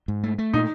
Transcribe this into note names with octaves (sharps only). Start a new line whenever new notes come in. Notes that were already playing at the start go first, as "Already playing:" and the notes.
G#2
A3
A3
A#2 D#4